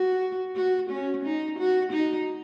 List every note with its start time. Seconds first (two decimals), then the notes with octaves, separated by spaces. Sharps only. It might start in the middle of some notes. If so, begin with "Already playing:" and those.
Already playing: F#4
0.56 F#4
0.90 C#4
1.25 D#4
1.59 F#4
1.93 D#4